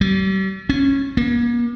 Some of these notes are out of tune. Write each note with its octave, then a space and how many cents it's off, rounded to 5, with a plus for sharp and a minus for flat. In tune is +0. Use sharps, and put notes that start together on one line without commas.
G3 -40
C#4 -15
A#3 +40